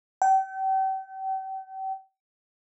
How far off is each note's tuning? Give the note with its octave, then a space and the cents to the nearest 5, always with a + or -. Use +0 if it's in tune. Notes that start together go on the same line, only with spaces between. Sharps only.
G5 -40